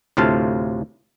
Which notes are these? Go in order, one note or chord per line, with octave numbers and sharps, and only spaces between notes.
D2 A2 C3 F4 F5 A5